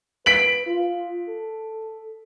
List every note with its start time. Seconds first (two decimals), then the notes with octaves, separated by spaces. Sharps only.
0.26 B4 B6 D7 F#7
0.66 F4
1.29 A4